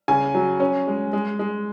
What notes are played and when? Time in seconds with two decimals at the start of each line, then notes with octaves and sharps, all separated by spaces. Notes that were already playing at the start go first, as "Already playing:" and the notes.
0.08 C#3 G#5
0.35 F#3
0.60 C#4
0.87 G#3
1.13 G#3
1.39 G#3